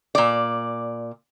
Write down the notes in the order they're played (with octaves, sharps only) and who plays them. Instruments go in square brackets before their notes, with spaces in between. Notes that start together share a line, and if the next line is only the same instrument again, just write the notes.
[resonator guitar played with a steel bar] A#2 D5